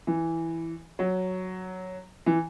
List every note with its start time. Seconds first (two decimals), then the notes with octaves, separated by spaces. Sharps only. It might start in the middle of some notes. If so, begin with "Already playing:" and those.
0.07 E3
0.99 F#3
2.26 E3